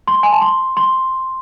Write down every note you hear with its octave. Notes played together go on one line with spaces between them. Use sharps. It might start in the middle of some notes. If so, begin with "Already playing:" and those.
C6
G#5
A5
C6
C6